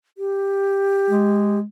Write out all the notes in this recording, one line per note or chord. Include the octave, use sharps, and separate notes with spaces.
G4
G#3